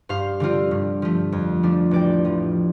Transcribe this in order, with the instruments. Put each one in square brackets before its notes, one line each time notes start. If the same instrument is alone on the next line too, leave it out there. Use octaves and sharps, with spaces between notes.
[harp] G2 C5 F5
D3 G3 C4 F4
G2
F3 A3
F2
F3 A3 D4
A1 D5 G5
A2 F3